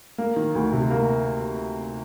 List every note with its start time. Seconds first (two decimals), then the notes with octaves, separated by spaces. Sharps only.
0.18 A#3
0.36 D#3
0.55 D2
0.72 C3
0.90 A#3